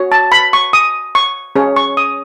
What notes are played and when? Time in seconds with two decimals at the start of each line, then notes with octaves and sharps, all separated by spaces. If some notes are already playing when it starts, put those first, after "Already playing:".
Already playing: F#4 C#5
0.12 A5
0.32 B5
0.53 C#6
0.73 D#6
1.15 C#6
1.56 C#4 G#4 C#5
1.76 C#6
1.97 D#6